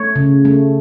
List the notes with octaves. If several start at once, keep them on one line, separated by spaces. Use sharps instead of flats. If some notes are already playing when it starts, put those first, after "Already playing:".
Already playing: A3 C#5
C#3
A3